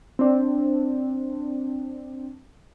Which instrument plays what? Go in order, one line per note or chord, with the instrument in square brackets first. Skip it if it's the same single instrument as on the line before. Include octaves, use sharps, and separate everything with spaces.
[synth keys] C4 D4